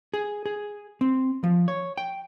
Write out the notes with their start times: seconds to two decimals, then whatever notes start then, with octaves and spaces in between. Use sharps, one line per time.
0.14 G#4
0.46 G#4
1.01 C4
1.44 F3
1.68 C#5
1.98 G5